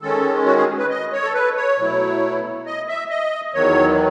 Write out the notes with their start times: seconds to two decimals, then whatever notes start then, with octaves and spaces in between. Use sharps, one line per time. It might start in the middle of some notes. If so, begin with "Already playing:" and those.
0.02 D#3 G#3 C#4 A4
0.46 F#4
0.57 G#4
0.78 B4
0.90 D#5
1.12 C#5
1.24 A4
1.34 B4
1.56 C#5
1.78 B2 F#3 A3 E4
2.66 D#5
2.88 E5
3.10 D#5
3.54 E2 D#3 F#3 C#5